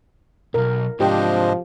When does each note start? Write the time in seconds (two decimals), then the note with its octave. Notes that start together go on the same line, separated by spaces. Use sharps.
0.54 B1 G#2 A#4
1.00 G#2 C3 F3 D4 G4 C5 D#5 G5